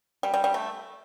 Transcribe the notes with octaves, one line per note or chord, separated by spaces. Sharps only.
G3
G3
G3
A3